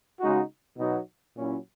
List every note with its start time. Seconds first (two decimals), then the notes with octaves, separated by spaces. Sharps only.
0.20 C#3 G#3 D#4 F#4
0.77 B2 F#3 B3 D#4 F#4
1.36 A#2 F#3 C#4 E4